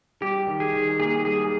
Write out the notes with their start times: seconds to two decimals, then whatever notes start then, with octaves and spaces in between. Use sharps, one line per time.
0.21 G3 G4
0.47 D#3
0.60 G#4
0.74 D#3
0.99 A#3 G#4
1.25 G3 G#4